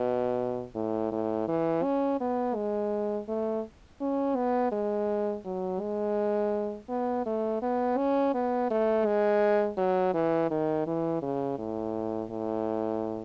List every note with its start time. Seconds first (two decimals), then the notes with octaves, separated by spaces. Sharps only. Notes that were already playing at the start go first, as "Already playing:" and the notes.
Already playing: B2
0.75 A2
1.12 A2
1.48 E3
1.83 C#4
2.20 B3
2.55 G#3
3.28 A3
4.01 C#4
4.36 B3
4.72 G#3
5.45 F#3
5.81 G#3
6.89 B3
7.26 A3
7.62 B3
7.98 C#4
8.34 B3
8.70 A3
9.06 G#3
9.78 F#3
10.14 E3
10.51 D#3
10.87 E3
11.22 C#3
11.58 A2
12.31 A2